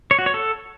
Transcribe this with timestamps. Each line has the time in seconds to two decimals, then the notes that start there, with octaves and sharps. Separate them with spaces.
0.11 C#5
0.19 F#4
0.26 C#5
0.34 A4